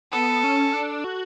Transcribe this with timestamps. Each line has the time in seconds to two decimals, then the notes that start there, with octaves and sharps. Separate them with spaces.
0.12 B3 A4
0.44 C#4
0.74 D4
1.04 F#4